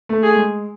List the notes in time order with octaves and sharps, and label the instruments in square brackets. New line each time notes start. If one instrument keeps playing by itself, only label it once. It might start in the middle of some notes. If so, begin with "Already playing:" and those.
[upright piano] A3
[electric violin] G#4
[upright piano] G#3